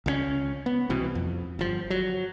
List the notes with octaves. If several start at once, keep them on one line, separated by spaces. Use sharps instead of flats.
C#2 G3 C#4
B3
C2 B2 E3 C4
F2
G1 F3
F#3